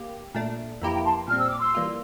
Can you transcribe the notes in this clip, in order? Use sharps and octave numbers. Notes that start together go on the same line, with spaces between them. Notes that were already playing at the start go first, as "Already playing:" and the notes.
Already playing: A#3 G4
A#2 A3 D4
F2 E3 A#3 E4 G4 G5 A#5
G5 A#5
A5 C6
A#2 G3 C4 F6
E6
D6
C6 E6
E3 G3 A#3 F4